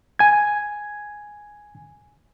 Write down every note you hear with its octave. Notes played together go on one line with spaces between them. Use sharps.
G#5 G#6